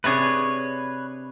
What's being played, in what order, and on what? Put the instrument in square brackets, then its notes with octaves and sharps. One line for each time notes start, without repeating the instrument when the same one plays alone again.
[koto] C3 D4 G#4 [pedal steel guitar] B4 C#5